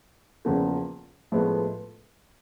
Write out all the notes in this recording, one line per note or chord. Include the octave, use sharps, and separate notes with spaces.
E2 C#3 F3 A#3
A2 F3 G#3 B3